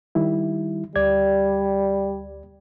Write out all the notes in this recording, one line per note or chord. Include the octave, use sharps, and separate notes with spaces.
D#3 G3 E4
D2 G3 D5 G#6